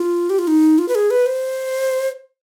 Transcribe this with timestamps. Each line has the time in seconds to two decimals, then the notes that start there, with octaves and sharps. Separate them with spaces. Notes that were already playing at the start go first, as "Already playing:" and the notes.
Already playing: F4
0.30 G4
0.39 F4
0.47 D#4
0.78 F4
0.88 B4
0.95 G#4
1.11 B4
1.26 C5